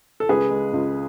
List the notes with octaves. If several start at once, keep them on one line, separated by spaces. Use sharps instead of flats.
A4
C#2 G#4 B4
G#3
C#2